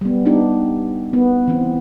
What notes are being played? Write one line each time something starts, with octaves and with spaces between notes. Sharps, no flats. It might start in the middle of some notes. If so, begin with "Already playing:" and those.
G3 B3
B3 D4 D#4 G4
B3
E3 C4